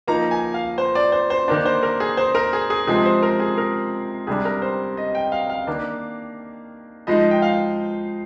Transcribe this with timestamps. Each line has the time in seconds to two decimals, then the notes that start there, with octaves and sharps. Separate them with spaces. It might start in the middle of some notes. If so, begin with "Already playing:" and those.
0.07 F3 A#3 D#4 A#5
0.31 G#5
0.54 F5
0.78 C5
0.95 D5
1.12 C5
1.30 C5
1.48 D#3 A#3 D4
1.65 C5
1.83 A#4
2.00 G#4
2.17 C5
2.35 A#4
2.53 G#4
2.70 G#4
2.87 C3 F3 G#3 C4 G#4
3.06 C5
3.23 A#4
3.40 G#4
3.58 A#4
4.27 C3 G3 D4 G#4
4.45 A#4
4.62 C5
4.97 D#5
5.15 G5
5.32 F5
5.49 F5
5.67 D#3 A#3 D4
7.07 F3 G#3 D#4 D#5
7.31 G5
7.42 F5